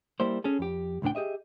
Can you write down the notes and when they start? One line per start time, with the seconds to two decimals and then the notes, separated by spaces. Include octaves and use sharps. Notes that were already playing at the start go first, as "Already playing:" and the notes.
0.20 G3 A#3 E4 C5
0.44 C#4 G#4 A4
0.59 F2 G4
1.02 C#2 A2 A#3 D4 G5
1.15 G4 G#4 D#5 E5